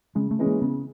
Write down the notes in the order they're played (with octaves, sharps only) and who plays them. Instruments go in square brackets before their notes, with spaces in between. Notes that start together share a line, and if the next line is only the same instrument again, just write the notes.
[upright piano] C#3 [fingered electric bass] G#3
[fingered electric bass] A3
[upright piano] E3 G#3 C#4
[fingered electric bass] A#3
[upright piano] C#3 [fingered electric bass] B3